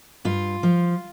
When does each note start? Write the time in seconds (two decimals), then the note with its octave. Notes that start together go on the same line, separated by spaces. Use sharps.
0.25 G2 F4
0.63 F3